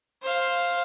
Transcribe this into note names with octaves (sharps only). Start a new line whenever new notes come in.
C5 F5